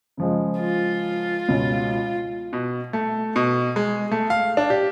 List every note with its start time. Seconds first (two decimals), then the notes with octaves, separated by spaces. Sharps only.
0.17 C#3 F3 G#3
0.59 F4
1.48 C#2 B2 C#4
2.53 B2
2.93 A3
3.36 B2
3.76 G#3
4.11 A3
4.30 F5
4.57 D4
4.70 G4